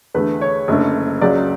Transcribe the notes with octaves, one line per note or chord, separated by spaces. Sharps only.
E2 D3 A3 B4
C#5
F#1 F#2 D3 A3
C#2 C#3 F#3 D5